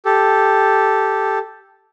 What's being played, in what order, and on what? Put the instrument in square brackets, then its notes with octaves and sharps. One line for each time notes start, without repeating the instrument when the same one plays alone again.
[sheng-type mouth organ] G4 A4